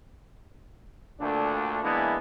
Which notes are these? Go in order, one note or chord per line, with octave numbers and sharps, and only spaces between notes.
D2 A#2 D3 A3 D4
E3 G#3 A#3 B3 D4 E4